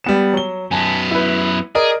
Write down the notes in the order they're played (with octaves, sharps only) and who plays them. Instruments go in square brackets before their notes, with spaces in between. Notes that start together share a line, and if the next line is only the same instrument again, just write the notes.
[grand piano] G3 B3 E7
F#3 G7
[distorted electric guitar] F#2 B3 [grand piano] G#5 A5
[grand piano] E4 B4
[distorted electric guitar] G#4 [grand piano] A#4 D5 D#5